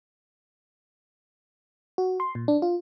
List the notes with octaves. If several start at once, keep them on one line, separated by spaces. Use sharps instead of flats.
F#4
C6
A#2
D4
F4